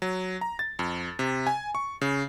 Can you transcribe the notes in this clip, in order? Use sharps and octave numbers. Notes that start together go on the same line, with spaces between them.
F#3
A#5
A6
F2
C3
G#5
C#6
C#3